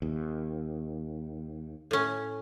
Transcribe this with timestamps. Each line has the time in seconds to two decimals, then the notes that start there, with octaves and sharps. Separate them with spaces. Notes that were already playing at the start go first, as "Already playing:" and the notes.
0.02 D#2
1.91 A2 C#4